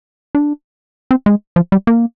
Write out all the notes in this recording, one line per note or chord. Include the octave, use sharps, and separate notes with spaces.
D4
C4
G#3
F3
G3
A#3